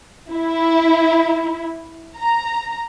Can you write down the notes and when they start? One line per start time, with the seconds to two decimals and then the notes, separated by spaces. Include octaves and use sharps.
0.32 E4
2.17 A#5